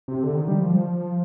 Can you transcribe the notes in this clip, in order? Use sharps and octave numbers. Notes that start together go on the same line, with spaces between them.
C3
D3
D#3
G3
F3